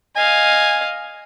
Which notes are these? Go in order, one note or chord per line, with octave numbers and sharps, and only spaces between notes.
D#5 F5 G#5